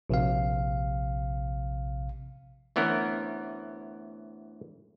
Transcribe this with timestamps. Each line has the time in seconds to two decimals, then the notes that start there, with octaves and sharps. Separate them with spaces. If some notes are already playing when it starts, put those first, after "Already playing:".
0.10 A#1 C3 F5
2.76 D2 E3 B3 C#4 A#4